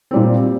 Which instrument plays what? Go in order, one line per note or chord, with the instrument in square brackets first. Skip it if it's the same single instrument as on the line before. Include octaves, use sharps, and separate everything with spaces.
[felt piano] A#2 G3 C4